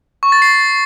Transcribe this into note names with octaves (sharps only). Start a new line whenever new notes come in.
C#6
A6
C7